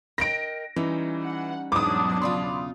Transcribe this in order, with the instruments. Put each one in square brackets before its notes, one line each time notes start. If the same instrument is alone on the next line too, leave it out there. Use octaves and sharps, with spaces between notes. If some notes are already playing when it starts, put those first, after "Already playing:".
[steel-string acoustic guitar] A#4 D#5 G5 [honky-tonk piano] A#6 D7
[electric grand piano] E3 [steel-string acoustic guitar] G3 C#4 D#4
[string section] F#5
[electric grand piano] E2 G#2 [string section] B2 F#3 D4 [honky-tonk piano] D6 D#6
[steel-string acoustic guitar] E2 C#3 F4 [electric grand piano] D5 B5 C6